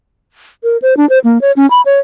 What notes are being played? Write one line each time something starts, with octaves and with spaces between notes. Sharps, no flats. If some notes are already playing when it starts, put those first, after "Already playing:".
A#4
C5
D4
C5
A#3
C#5
C#4
B5
C#5